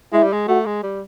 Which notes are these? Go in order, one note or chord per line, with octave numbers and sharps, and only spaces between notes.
G#3 E4
G3
G#3
A3 F#4
G#3
G3